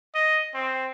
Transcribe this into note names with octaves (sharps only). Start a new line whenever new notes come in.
D#5
C4